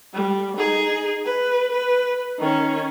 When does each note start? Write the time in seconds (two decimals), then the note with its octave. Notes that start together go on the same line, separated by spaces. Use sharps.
0.14 G3
0.57 D#4 G#4
1.25 B4
1.72 B4
2.39 D#3 C#4